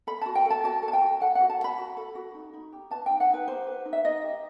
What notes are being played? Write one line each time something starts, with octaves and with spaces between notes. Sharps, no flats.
A4 B5
F#4 A5
G5
A4
A5
F#4 A5
A4
A5
G5
F#4
A4 F#5
F#4 F#5
A5
A4
B5
F#4
A4
F#4
D#4
D#4
G4
B4 A5
D#4 G5
F#5
D#4 B4
G4 C5
B4
D#4
E5
D#4 D#5
G4